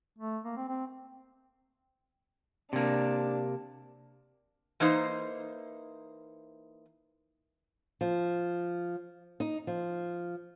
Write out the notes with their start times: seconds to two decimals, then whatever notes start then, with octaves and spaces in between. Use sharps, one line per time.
0.18 A3
0.45 A#3
0.56 C4
0.68 C4
2.73 C3 A#3 D4
4.80 E3 A#3 D#4 C5
8.01 F3
9.40 D#4
9.67 F3